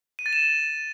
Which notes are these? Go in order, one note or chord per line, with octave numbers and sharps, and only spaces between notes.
D#7
A6
E7